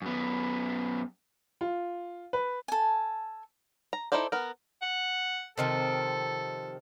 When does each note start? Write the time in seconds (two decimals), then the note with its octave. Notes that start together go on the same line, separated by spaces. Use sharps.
0.02 F#2 B3
1.61 F4
2.33 B4
2.68 A4 G#5
3.93 A#5
4.12 D#4 E4 A4 C5 D5
4.32 B3 A#4
4.82 F#5
5.58 C3 D#3 F3 A4